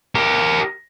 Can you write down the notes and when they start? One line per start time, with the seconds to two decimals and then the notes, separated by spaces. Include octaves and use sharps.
0.15 G4 A#4